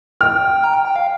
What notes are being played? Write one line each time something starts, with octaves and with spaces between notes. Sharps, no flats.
G5 F6
A#5
G5
G5
F5